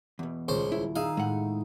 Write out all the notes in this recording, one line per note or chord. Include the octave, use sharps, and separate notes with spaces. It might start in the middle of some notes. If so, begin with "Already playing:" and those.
E2 B2
D#1 C#2 C5
E4
D#4 G#4 E5 F5
A2 G#3 F#5